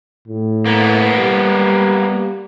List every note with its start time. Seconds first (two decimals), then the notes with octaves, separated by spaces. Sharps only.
0.28 A2
0.66 A#3 B3
1.19 G3